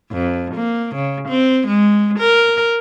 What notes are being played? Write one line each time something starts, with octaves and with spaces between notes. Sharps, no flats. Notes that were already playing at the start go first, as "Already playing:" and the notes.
F2
A#3
C#3
C4
G#3
A#4